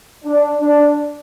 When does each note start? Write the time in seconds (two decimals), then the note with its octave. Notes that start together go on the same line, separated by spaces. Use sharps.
0.24 D4
0.60 D4